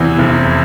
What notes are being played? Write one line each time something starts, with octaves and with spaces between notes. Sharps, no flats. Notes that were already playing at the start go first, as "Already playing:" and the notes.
Already playing: E2 C3 E3
F1